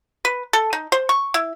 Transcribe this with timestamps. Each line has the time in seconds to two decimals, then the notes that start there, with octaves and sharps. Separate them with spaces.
0.25 B4
0.53 A4
0.73 D#4
0.92 C5
1.09 C#6
1.34 E4